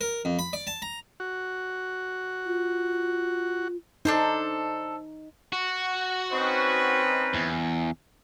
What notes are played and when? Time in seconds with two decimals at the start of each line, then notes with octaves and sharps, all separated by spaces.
0.01 A#4
0.25 F2
0.39 B5
0.53 D5
0.67 A5
0.82 A#5
1.20 F#4
2.46 F4
4.05 D4 D#4 A4 C5
5.53 F#4
6.32 C4 C#4 D#4 B4
7.34 E2